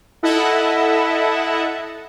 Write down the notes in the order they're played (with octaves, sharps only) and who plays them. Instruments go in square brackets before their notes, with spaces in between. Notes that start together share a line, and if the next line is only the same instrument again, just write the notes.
[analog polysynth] E4 A4 D#5 E5 F#5 A5